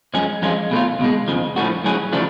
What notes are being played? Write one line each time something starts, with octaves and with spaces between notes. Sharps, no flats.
F#2 F3 G#3 C#4 G#4
F2 F3 G#3 C#4 F4
B2 A3 F4
C#2 B2 G#3
F2 C#3 F3
A2 F3 A3 C#4 F#4
A2 F#3 C#4 G#4
C#3 F3 A3 D4